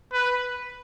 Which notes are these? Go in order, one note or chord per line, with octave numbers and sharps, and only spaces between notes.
B4